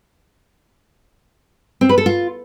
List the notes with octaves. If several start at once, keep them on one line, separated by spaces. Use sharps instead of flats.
C4
B4
A4
F4